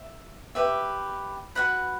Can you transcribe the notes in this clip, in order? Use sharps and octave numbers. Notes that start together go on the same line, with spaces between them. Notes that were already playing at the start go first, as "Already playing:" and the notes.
Already playing: E5
G4 B4 E5
F#4 B4 F#5 B5